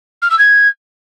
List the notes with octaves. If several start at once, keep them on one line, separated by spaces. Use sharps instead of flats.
F6
E6
G#6